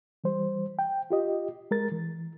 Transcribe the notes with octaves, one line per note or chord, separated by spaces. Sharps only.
E3 G3 C5
G5
F4 G4 D#5
G#3 A#4 A6
E3